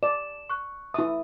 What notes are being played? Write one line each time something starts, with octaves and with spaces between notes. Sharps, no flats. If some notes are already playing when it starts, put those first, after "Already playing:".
D5 E7
C#6 F#6
E4 E5 D#6